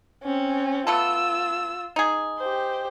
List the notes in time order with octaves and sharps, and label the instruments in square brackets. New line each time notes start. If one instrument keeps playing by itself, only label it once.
[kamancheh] C4 C#4
[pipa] A3 B3 A4 [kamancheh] F4 E6
[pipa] D#4 G#4
[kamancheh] G4 C5